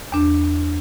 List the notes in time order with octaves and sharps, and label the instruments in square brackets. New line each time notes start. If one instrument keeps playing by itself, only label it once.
[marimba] E2 D4